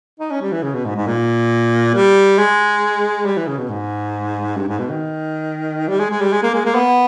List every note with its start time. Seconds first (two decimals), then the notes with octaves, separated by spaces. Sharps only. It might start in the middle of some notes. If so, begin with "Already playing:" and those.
0.20 D#4
0.31 C#4
0.41 G3
0.52 E3
0.63 C#3
0.74 B2
0.85 G#2
0.96 G#2
1.07 A#2
1.94 G3
2.38 G#3
3.26 G3
3.37 E3
3.48 C#3
3.58 B2
3.69 G#2
4.57 G2
4.68 G#2
4.79 B2
4.90 D#3
5.88 G3
6.00 G#3
6.10 G#3
6.21 G3
6.32 G#3
6.43 A#3
6.54 G#3
6.65 A#3
6.75 B3